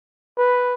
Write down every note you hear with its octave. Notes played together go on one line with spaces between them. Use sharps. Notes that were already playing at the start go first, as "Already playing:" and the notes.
B4